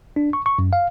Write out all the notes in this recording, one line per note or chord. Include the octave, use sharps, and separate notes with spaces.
D4
C#6
C#6
F#2
F5